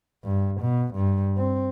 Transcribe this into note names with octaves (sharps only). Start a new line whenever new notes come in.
G2
B2
G2
C4